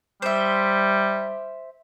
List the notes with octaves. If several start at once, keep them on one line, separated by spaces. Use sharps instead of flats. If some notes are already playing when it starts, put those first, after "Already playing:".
G3 C5 E5